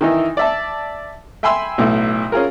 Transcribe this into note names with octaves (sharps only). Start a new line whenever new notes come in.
D#3 E3 D#4 E4
D5 E5 A5
E5 G5 G#5 B5 C6 E6
B1 A2
C#4 F4 G#4 A#4